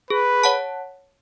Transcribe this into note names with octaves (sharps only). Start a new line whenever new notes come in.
G#4 B4
C#5 F#5 A5